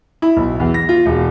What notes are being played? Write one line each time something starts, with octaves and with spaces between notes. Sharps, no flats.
E4
B1
E2
A#6
F4
E1